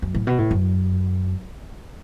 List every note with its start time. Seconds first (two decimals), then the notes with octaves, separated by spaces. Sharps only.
0.02 F#2
0.15 A2
0.27 B2
0.38 A2
0.51 F#2